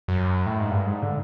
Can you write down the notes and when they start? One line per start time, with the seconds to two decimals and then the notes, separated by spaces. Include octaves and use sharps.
0.08 F#2
0.46 A2
0.59 G#2
0.70 G2
0.86 G#2
1.02 D3